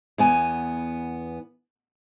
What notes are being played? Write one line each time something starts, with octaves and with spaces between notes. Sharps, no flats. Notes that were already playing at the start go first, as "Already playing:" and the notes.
E2 B3 G#5